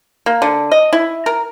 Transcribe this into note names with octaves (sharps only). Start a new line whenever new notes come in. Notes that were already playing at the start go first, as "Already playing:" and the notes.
A#3
D3
D#5
E4
A#4